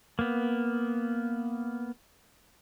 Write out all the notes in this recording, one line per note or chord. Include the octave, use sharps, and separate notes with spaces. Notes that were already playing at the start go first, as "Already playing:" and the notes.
A#3 B3